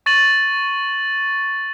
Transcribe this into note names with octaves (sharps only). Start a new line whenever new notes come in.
C#6 A6 D#7 F#7